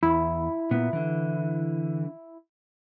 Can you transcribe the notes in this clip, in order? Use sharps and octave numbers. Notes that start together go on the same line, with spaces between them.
E2 E4
A#2 B3
D3 E3